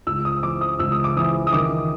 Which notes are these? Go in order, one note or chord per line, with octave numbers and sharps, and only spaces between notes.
C#2 E6
D#6
E3 D6
D#6
C#2 E6
D#6
D6
E3 D#6
D#6
D#3 D6